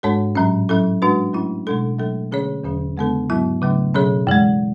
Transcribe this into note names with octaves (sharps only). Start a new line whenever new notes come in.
G#2 G#3 D4 A4 C#5
A2 F#3 C#4
F#3 C#4 E4 A4
G#3 D4 F#4 B4
F#3 A3 C#4 E4
B2 G#3 D4 A4
F#3 A3 D4 A4
D3 A3 C#4 G#4 C#5
E2 D3 F#3 C#4 G#4
C#3 G#3 B3 D4 A4
G#2 F#3 B3 E4
C#3 F#3 A3 D4
B2 F#3 C#4 G#4 C#5
F#2 E3 G#3